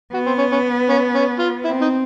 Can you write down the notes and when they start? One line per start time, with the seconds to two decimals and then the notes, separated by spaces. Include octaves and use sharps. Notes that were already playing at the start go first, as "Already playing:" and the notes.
0.14 B3 F#4
0.26 C4
0.38 C#4
0.52 C#4
0.89 C#4
1.15 C#4
1.39 F4
1.65 C4 E4
1.82 D#4